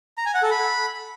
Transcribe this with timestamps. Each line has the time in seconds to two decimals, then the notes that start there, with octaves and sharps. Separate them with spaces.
0.18 A#5
0.26 G#5
0.34 F#5
0.43 A4
0.51 B5